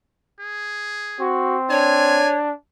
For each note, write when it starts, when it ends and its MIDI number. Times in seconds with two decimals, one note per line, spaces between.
0.40 1.29 68
1.20 2.23 60
1.20 1.57 66
1.70 2.51 62
1.70 2.35 73
1.70 2.32 80